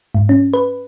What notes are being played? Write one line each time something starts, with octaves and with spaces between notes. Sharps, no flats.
G#2
C#4
B4